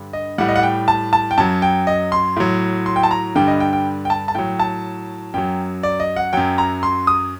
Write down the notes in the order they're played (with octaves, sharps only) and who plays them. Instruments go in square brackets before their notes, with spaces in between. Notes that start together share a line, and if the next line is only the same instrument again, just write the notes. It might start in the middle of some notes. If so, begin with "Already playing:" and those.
Already playing: [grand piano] G2 D3 G3
D#5
A2 G3 F#5
D#5
F#5
G5
A5
A5
G5
F#2 F#3 A5
G5
D#5
C6
A2 F#3
C6
G5
A5
A#5
G2 D3 G3 G5
D#5
G5
G5
G5
A5
A5
A2 F#3 G5
A5
F#2 F#3 G5
D5
D#5
F#5
F#2 F#3 G5
A#5
C6
D#6